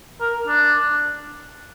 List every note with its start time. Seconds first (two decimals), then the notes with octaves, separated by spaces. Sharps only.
0.21 A#4
0.47 D4